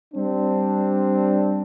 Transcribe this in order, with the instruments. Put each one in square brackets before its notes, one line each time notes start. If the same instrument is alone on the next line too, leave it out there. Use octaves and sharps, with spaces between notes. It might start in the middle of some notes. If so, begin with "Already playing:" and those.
[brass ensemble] G3 C4 D4